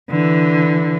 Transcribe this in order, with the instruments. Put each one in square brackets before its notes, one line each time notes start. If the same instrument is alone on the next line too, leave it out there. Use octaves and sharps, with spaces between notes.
[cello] D3 E3